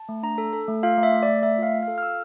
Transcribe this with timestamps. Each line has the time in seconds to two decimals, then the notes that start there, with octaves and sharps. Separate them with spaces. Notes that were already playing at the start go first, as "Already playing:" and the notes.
Already playing: A5
0.09 A3
0.23 D4 A#5
0.38 A4
0.53 A4
0.68 A3
0.83 F4 F5
0.98 A3
1.03 E5
1.13 A3
1.23 D5
1.28 A3
1.43 A3 E5
1.58 F4 F5
1.73 F4
1.83 A4 F5
1.98 F6
2.03 F4 E6